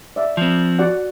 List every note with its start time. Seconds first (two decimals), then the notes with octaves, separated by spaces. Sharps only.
0.16 D5 E5
0.37 F3 C4
0.79 F#4 D5 F#5